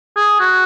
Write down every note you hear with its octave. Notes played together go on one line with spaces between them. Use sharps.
G#4
F#4